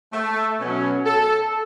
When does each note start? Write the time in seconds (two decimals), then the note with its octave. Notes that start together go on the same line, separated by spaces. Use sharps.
0.13 A3
0.60 B2 F#3 C#4
1.06 A4